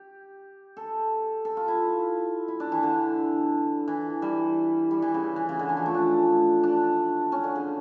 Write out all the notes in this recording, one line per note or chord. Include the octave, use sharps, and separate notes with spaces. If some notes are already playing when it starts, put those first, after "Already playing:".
Already playing: G4
A4
A4
F4
E4
E4
D4
E3
D3
E3
G3
G3
E3
C#3
E3
C#3
D3
E3
F3
A3
D4
D4
C#4
D3
C#3